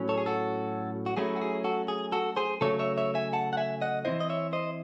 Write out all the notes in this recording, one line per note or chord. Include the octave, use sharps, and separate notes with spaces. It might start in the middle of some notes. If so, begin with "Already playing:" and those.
Already playing: A2 F#3 C#4
A4 C#5
G#4
F#4 A4
F#4
F#3 A3 C#4 E4 G#4
F#4
G#4
F#4 A4
G#4
F#4 A4
G#4 C5
C#3 F#3 A3 A4 C#5
C#5 E5
C#5 E5
E5 G#5
F#5 A5
F#5
E5 G#5
D#5 F#5
E3 C4 E4 C5 D#5
D#5
C#5 E5
C5 D#5